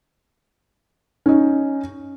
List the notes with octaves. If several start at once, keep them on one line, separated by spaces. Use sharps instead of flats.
C#4 D#4